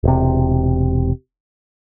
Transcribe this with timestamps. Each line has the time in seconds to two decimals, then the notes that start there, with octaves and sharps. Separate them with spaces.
0.04 E1 C3